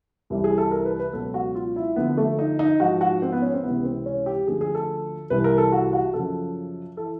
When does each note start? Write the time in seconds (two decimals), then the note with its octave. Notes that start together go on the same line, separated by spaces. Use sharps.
0.30 C2 C3 E3
0.44 G#4
0.58 A4
0.71 A#4
0.85 B4
0.99 B4
1.13 C#2 B2 F#3 A4
1.34 F#4
1.55 F4
1.76 E4
1.96 D2 D3 F3 B3
2.17 A3
2.39 D#4
2.59 D#4
2.80 G#2 F3 F#4
3.01 F#4
3.22 C4
3.32 B3
3.42 C#4
3.54 C4
3.63 C#2 C3 E3 B3
3.84 C4
4.06 C#4
4.26 G4
4.47 D2 D3 F3 G#4
4.61 G#4
4.75 A4
5.30 C2 C3 E3 B4
5.44 A#4
5.58 A4
5.72 F#4
5.93 F#4
6.14 F#2 C#3 F3 A4
6.97 E3 A4